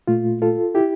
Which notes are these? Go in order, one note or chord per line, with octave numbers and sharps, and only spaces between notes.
A#2 A3 F4
F4 A4
E4 G4